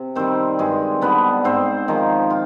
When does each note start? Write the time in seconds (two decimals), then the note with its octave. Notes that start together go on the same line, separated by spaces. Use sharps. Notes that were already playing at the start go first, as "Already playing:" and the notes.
Already playing: C3
0.15 D#3 G3 C4 C5
0.59 G2 G#3 G#4
1.01 D3 G3 B3 B4
1.44 G#2 C4 C5
1.88 D#3 F3 G#3 D#4
2.30 F4